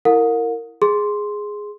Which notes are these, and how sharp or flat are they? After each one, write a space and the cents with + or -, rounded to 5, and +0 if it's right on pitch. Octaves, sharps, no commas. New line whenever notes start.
E4 +0 A#4 -20 F#5 -45
G#4 +0 C6 +0